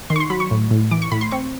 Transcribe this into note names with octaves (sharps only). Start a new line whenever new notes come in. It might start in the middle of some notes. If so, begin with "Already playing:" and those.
D#3 C6
C#6
C6
F#3 B5
C#6
A2
A2
E3 D6
C#6
A2 B5
C6
C4 C#6